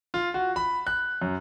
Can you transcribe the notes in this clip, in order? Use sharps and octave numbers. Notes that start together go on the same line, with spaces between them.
F4
F#4
B5
F#6
F#2